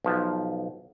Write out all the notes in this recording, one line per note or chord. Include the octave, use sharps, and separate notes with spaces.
B1 F3